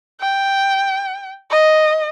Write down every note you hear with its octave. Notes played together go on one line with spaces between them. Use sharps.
G5
D#5